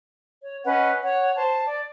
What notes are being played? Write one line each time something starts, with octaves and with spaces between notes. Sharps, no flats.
C#5
C#4 B4 D#5 F#5
C#5 F#5
C5 A5
D5